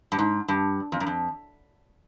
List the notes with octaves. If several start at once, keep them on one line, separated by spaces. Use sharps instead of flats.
G2
G#2
G2
F2
F#2
F2